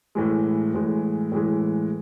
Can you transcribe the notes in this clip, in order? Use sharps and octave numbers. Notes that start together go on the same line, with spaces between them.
A2 E3 G#3
A2 E3 G#3
A2 E3 G#3